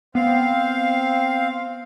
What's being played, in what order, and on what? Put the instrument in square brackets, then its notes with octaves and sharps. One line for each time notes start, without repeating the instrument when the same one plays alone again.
[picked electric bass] B3 [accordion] C4 F5